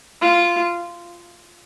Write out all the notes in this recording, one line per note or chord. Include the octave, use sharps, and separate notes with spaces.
F4